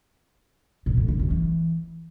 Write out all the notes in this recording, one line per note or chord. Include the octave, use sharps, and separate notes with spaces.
A#2
A2
D3
F#2
E3